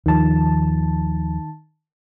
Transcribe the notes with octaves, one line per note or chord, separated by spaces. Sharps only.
D#2 D#3 F3 A5